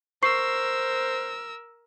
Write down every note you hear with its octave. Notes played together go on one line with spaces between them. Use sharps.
A#4 C5 C#6 E6 C7